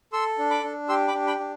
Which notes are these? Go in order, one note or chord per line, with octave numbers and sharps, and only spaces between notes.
A4 C6 E6
D4
B5 D6
D4
G4 C6 E6
B5 D6
D4
G5 B5
D4